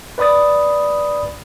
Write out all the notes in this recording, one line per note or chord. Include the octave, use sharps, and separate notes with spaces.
B4 D5 B5 D#6 A6